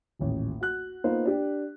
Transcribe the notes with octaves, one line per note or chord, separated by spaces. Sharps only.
D#1 A1
F#4 F#6
A#3 B3 D#4 F4 C5
D4 G4